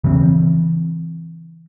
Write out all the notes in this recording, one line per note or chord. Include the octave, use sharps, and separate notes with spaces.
C#3 E3 C4